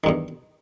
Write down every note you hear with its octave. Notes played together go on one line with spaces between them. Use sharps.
E2 G2 D#3